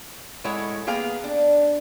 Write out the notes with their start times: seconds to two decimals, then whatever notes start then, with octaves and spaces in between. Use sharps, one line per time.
0.44 A2 G#3 E4 A4 C#5 F#5
0.87 A#3 B3 G#4 F5 G5 A#5
1.24 D4